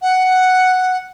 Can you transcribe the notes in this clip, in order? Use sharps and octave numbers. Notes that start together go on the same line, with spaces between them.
F#5